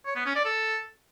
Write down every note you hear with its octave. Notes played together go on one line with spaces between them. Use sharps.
C#5
B3
C#4
D5
A4